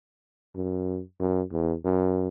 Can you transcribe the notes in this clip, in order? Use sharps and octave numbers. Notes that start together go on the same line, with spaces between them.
F#2
F#2
E2
F#2